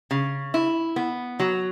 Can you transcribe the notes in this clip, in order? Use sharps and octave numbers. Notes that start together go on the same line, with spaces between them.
C#3
E4
B3
F#3